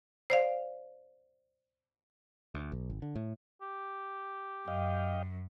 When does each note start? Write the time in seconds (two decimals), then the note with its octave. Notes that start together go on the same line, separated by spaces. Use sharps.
0.30 C5 D5 F5
2.54 D2
2.72 B1
2.90 G#1
3.02 D3
3.15 A2
3.61 G4
4.68 F#2 D#5 F5 G5